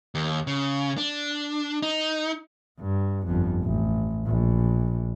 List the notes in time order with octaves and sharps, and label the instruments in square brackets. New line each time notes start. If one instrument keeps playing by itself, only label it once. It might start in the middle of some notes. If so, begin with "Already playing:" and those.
[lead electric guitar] D#2
C#3
D4
D#4
[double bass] G2
G1 F2
A1
A#1